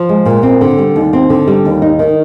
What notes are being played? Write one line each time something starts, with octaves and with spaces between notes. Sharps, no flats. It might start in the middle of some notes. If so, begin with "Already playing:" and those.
Already playing: F3
G#3
A#2
C4
D3
G3
D#2
C4
D3
G3
D#2
D#4
D#3